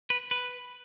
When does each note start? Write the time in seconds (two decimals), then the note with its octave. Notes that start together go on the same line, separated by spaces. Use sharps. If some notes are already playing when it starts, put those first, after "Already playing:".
0.10 B4
0.31 B4